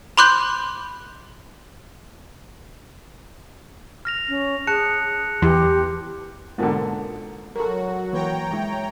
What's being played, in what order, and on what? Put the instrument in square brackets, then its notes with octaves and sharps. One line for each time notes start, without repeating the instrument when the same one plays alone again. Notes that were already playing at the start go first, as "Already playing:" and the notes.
[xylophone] B5 C6 D6 F#6 G6
[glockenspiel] F6 A#6 F7
[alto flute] C#4
[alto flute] G#4 [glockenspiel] A5 F#6 C#7
[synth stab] E2 [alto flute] G4 [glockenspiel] C6
[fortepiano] G#2 B2 D3 [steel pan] A#3 F4 A#4
[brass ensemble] F#3 [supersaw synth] F#4 [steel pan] A4 A#4
[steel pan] E3 A#3 B4 [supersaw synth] C#5 G5 A#5
[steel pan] F#3 G#3 E4